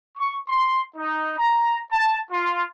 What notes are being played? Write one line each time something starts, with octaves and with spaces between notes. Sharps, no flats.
C#6
C6
D#4
A#5
A5
F4